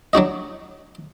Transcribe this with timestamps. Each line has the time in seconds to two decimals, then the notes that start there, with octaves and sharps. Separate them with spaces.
0.13 F#3 D4 F#4 D#5